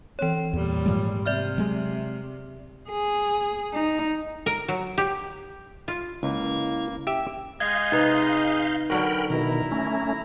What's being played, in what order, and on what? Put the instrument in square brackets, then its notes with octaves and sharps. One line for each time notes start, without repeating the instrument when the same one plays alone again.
[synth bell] E3 C#5 [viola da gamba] C4
[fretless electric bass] E2 [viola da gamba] A#2 G3
[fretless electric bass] G#2 F3 G#3
[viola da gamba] C3 [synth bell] D5 E5 F6
[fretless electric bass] F#3 G#3
[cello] G#4
D#4
[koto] A#4
F#3
G4
F4
[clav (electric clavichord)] C#2 [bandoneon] A#3 [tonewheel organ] C#4 E4
[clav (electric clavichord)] G4 E5
[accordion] G#3 D#5 [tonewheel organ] F5 G6 [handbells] G#6
[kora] C3 [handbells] D#4 B4
[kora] D3 F#3 F#4 [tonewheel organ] A#4 G5 B5
[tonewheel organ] B2 D#3 [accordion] E4 A#5
[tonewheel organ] A3 C#4